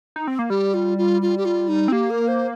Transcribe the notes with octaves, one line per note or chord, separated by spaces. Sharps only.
D#4
C4
A#3
G3 G4
F4
F4
F4
G4
F4
D#4
C4
A#3 G4
A#4
C5